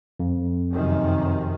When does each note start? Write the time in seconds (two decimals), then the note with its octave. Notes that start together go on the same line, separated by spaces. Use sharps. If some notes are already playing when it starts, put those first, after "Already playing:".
0.20 F2
0.73 F#2 C3 D#3